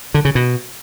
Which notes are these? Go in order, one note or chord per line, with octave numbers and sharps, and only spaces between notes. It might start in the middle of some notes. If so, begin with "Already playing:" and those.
D3
C#3
B2